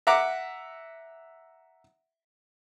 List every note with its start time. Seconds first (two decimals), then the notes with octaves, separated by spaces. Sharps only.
0.07 E5 F#5 A#5 D6